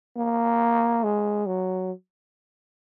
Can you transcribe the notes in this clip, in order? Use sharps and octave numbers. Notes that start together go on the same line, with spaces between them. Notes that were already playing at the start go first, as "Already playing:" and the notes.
A#3
G#3
F#3